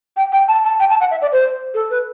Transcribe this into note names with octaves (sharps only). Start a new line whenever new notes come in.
G5
G5
A5
A5
G5
A5
F#5
E5
D5
C5
A4
B4